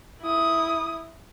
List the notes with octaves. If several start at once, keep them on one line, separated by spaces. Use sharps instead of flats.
E4 D#6